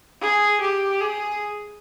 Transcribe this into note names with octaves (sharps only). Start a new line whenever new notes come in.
G#4
G4
G#4